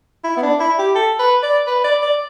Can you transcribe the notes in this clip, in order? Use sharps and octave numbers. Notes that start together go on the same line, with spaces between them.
E4
B3
D4
E4
G4
A4
B4
D5
B4
D5
D5